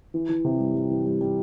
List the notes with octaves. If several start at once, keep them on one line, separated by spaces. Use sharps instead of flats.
E3
E3
C3
G3
G3
E3
G3
G3